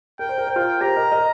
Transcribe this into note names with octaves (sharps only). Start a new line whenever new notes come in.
A#4 G5
C5
A#4
C5 G5
F4 A#4
G4 C5 A#5
A#4 D#5
A#4 D#5